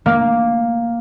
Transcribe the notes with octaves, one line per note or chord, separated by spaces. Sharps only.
A#3